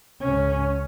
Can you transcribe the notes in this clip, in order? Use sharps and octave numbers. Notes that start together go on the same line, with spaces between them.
C#2 C#4